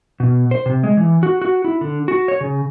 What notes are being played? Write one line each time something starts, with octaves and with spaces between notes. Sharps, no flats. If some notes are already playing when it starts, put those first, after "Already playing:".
B2
C5
C3
G#3
E3
F#4
F#4
E4
D3
F#4
C#5
C#3